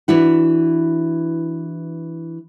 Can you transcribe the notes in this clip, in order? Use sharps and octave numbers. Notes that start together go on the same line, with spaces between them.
E3 D4 E4 F#4